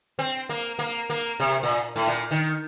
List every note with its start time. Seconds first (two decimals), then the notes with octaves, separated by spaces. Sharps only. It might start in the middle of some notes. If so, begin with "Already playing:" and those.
0.19 C4
0.49 A#3
0.79 A#3
1.10 A#3
1.40 C3
1.63 A#2
1.96 A2
2.07 A#2
2.31 D#3